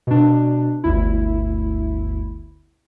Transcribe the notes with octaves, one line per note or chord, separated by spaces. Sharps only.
B2 D4
G1 D2 E4